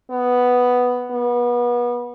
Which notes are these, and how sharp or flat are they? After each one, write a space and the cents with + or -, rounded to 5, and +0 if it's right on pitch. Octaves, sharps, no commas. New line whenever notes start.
B3 +0
B3 -30